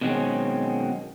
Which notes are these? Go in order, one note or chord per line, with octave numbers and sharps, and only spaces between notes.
B2 D#3 F#3 G#3 C4 C#4